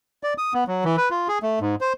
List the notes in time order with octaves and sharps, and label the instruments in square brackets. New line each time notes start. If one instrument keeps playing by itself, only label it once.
[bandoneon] D5
D#6
B3
F#3
E3
B4
F4
G#4
A3
G#2
C5